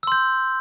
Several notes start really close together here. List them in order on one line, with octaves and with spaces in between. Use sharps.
E6 C6 G6